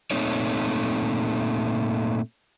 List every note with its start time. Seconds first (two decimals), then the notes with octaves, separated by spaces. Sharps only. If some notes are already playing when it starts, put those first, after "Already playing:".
0.11 A#2 A3 C4 D#4 C#5